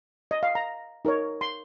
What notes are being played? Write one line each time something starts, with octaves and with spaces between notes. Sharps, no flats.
D#5
F5
A#5
D#4 A#4 C#5
C6